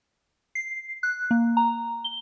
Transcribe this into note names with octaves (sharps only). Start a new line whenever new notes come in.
C7
F#6
A#3
A#5
G7